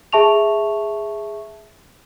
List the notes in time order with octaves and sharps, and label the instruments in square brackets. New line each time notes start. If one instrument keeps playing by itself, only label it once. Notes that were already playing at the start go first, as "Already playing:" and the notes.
[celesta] G#4 E5 A5 C#6 F7